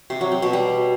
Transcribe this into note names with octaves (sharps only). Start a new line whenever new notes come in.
C3
F#3
C4
B2
G3